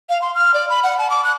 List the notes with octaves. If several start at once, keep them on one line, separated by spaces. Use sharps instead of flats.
F5
C6
F6
D5
B5
F#5
A5
D6
F#6